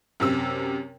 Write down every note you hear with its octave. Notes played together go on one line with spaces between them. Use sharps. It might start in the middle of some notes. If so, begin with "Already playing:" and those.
F#2 C3 E6